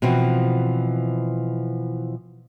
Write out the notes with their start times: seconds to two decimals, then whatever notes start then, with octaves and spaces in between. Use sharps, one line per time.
0.02 B2 E3 F3 C4 F#4